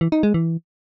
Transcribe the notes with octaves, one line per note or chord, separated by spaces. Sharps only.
E3
D#4
G#3
E3